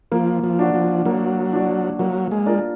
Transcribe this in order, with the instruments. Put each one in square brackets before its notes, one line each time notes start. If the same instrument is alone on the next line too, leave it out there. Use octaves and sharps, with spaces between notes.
[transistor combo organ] F3 [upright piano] A#3
[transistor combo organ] F3
[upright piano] D4 F#4 D5
[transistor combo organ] F3
[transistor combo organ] F#3 [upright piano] A#3
[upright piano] D4 F#4 D5
[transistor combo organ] F#3 [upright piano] A#3
[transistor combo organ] G#3
[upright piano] D4 F4 A#4 D5